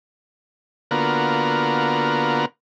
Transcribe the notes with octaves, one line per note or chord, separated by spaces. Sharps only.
D3 A#3 B3 F4 F#4 A#4